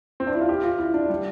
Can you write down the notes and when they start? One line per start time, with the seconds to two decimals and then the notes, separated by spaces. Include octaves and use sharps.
0.20 C4
0.27 D4
0.35 E4
0.41 F4
0.49 G4
0.64 F4
0.79 E4
0.94 D4
1.10 G3